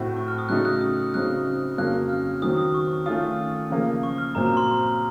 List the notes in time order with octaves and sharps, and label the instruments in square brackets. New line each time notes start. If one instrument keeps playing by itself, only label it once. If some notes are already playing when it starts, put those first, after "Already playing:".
Already playing: [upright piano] A2 A3 C4 F#4
[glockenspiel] C#6
F6
D#6
[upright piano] C#3 F#3 A3 D#4 [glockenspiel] F#6
[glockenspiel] F#6
D#6
F6
[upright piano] C#3 F#3 C4 D#4 [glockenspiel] F#6
[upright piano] F2 C#3 F#3 A#3 [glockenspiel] F#6
[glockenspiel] F6
[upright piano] D#3 F#3 C4 [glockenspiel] D#6
[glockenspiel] D#6
C#6
[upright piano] D#3 A3 C#4 F4 [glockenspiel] D#6
[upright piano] C#3 F3 A#3
[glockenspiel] C#6
F6
[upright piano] A#2 F#3 C4 [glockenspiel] A#5
[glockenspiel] A#5
C6